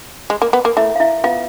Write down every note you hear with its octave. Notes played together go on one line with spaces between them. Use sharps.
G#3
A#3
B3
A#3
A3 E4 E5
F5
E4 E5
B3 F4 F5